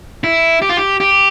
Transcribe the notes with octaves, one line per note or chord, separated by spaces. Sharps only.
E4
G4
F4
G4
G4